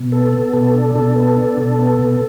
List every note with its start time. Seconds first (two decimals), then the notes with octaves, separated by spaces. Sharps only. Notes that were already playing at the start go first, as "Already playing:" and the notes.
Already playing: B2
0.12 B3 A4
0.33 B3
0.53 B2 A4
0.74 D4
0.95 B2 A4
1.16 B3
1.37 D4
1.57 B2
1.78 B3
1.99 B2